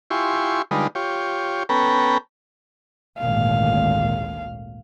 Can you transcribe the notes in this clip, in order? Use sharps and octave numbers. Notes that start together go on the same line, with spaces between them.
E4 F4 G4 G#5 C6 C#6
D3 G3 G#3 D#4 F4 B4
F4 G4 C#5
B3 C#4 A4 B4 G5 A#5
G#1 D2 A#2 F5